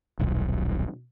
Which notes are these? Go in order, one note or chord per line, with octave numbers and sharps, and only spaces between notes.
D#1 B1